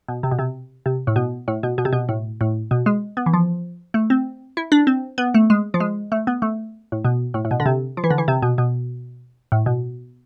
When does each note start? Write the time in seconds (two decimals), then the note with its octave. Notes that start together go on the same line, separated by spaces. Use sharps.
0.08 B2
0.23 C3
0.31 B2
0.39 C3
0.86 C3
1.07 A2
1.16 B2
1.48 A2
1.63 B2
1.78 B2
1.85 C3
1.93 B2
2.09 A2
2.41 A2
2.71 B2
2.86 G#3
3.17 B3
3.26 E3
3.33 F3
3.94 A3
4.10 C4
4.57 E4
4.72 D4
4.87 C4
5.18 B3
5.34 A3
5.50 G#3
5.74 F3
5.80 G#3
6.12 A3
6.27 B3
6.42 A3
6.92 A2
7.05 B2
7.34 A2
7.45 A2
7.51 B2
7.60 D3
7.66 C3
7.97 F3
8.04 E3
8.10 D3
8.18 E3
8.28 C3
8.42 B2
8.58 B2
9.52 A2
9.66 B2